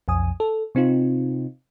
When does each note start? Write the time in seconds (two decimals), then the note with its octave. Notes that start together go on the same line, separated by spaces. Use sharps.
0.08 B1 F2 G#5 D#6
0.40 A4
0.75 C3 C4 D#4 F4